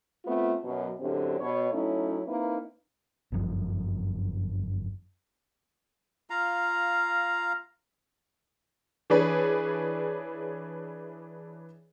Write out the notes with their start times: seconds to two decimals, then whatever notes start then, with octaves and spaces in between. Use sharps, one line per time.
0.25 A3 B3 C4 F4
0.64 F#2 B2 F#3
1.00 F#2 A2 D3 C4 G4
1.40 B2 C#5
1.72 F#3 A3 C#4 D#4 E4
2.26 A#3 C4 D#4 E4 B4
3.32 G1 F#2 F3
6.30 F4 F5 A#5
9.10 E3 D4 G#4 B4 C#5